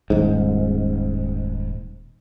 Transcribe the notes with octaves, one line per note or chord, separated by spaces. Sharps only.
D#1 G#2